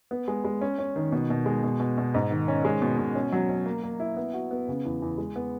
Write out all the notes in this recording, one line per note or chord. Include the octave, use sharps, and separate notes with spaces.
B3
G#3
G#3
C#4
C#4
D#3
B2
B2
G#3
B2
B2
B2
G#2
D#3
C#4
G#3
B2
B2
C#4
F#3
C#4
A#3
A#3
E4
B3
F#4
B3
C#3
E2
E2
G#3
B3